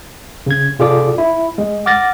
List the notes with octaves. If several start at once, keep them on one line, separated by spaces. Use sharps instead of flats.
C#3 G#6
C3 F4 G#4 A4 D5 D6
E4
G#3
F#5 D6 F6 A6 A#6